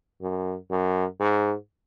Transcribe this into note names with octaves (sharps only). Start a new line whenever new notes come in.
F#2
F#2
G#2